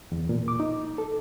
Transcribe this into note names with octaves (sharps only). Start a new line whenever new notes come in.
E2
A#2
D6
D#4
A4